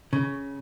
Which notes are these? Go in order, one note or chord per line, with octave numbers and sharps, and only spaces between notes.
C#3